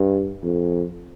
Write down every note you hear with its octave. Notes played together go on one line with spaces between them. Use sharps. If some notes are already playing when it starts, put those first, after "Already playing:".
Already playing: G2
F2